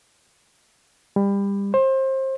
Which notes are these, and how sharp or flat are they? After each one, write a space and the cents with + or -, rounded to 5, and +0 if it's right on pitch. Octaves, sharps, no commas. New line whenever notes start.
G3 +25
C5 +25